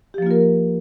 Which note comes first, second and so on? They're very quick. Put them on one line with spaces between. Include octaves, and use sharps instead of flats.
G4 F3 A#3 F4 A#4